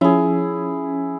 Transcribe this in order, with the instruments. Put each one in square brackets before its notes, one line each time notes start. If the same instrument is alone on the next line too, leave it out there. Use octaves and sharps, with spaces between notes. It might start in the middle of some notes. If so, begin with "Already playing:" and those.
[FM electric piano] F3 C#4 [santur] E4 G#4